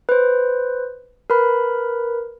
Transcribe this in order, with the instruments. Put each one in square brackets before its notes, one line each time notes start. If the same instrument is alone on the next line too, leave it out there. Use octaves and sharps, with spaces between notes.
[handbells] B4 C5
A#4 B4 B5